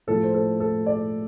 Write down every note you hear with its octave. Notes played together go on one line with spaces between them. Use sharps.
A2 F3 A3 A4
C5
A4
A4
D5